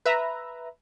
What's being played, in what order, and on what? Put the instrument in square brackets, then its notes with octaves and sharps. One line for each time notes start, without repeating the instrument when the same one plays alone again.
[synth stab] B4 E5 A#5